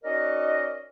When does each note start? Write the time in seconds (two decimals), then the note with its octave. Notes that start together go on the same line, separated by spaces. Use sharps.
0.04 C#4 D#4 F#4 A#4 D5 D#5